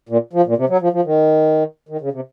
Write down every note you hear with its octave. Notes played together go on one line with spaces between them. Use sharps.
A#2
F3
A#2
C3
F#3
F3
F3
D#3
D#3
C#3
C3